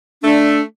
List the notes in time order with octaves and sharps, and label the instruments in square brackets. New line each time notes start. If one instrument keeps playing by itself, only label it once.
[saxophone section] A3 [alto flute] D4